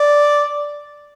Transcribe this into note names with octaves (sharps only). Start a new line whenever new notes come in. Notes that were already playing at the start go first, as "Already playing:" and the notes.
Already playing: D5